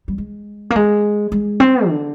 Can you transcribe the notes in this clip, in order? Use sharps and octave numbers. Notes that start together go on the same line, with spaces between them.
G3
G#3
A#3
G#3
G#3
C4
D3